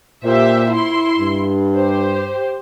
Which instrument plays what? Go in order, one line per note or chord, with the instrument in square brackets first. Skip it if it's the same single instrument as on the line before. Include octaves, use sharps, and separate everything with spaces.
[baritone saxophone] A#2 [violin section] G4 C5 E5
[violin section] E4 C6
[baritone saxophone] G2
[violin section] G4 C5